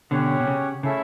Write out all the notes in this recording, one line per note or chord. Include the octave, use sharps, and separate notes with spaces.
B2 D3 C#4 G4 C#5 F#5
B2
C#3
C#3 A3 C#4 E4 A4 E5